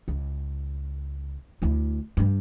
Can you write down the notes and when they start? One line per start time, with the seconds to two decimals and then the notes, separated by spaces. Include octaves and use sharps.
0.08 C#2
1.62 D2 E4
2.17 G2 G3